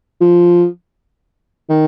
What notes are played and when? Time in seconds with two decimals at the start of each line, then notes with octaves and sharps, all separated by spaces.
0.21 F3
1.70 D#3